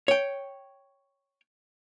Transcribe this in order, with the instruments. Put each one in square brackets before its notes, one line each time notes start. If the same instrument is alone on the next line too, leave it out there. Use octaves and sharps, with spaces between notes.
[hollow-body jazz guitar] C#5 G5